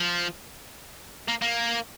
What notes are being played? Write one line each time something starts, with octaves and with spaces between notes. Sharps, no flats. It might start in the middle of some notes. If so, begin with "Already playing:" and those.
Already playing: F3
A#3
A#3